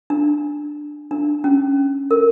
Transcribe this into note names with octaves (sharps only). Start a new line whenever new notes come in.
D4
D4
C#4
A#4